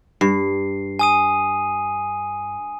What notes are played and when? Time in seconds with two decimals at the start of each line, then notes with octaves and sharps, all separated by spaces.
0.21 G2 C7
0.99 G#5 D#6 D#7